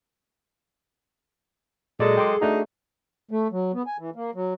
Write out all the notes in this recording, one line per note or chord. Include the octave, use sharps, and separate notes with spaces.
A#2 F#3 G#3 G#4 A4 D5
G5 C6 D6
A3 D4 D#4 F#4
A3
F#3
B3
G#5
E3
A#3
F#3